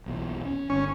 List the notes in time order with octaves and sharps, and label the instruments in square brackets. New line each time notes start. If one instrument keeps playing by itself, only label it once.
[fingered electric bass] B1 E2 A#2
C#4
[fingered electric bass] G1 [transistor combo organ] C#4